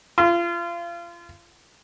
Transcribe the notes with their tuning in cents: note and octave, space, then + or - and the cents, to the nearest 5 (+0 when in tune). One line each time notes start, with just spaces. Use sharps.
F4 -30